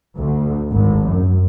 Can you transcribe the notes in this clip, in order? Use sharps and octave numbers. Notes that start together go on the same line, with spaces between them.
D2
G#1
F#2